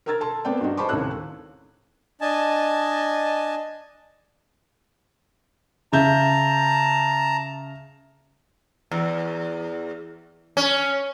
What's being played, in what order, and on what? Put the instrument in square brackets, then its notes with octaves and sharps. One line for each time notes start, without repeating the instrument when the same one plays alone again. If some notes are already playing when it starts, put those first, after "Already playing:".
[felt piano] A#4 A#5 E6 F6 G#6 A6
A4 A5 C6
A3 B3 C4 D5 G5
G2 D4 D#4 F#4
G#4 C5 A5 B5 C#6 D6
D#2 A2 C3 C#4 E6 F#6
[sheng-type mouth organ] D4 D#5 G#5 A5
[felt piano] C#3 E5 G6 [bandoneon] A5 A#5
[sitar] E2
C#4